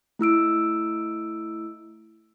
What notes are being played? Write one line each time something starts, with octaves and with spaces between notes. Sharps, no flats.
A3 E4 E6 D7